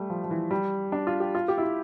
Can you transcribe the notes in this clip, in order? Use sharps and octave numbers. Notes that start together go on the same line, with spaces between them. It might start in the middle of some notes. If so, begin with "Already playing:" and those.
Already playing: G3 A3
F3
F3
E3
G3
D4
F4
G4
F4
G4
E4
F4